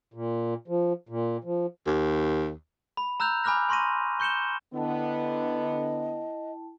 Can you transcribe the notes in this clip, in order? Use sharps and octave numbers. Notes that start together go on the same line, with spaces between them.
A#2
F3
A#2
F3
D#2
B5
A#5 E6 F#6 G6 F7
G#5 B5 D6 F6 F#6 A#6
G#5 C6 C#6 A#6 D#7
C#6 G6 C#7 E7 G7
D3 B3 E4 D#5 G5 A5